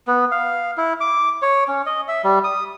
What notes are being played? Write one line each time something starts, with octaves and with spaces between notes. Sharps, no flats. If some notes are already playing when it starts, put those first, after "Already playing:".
B3
F5
E4
D6
C#5
C#4
D#5
E5
G3
D#6